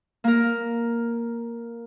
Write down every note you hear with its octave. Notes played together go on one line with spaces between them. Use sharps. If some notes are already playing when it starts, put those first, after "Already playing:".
A#3 A#4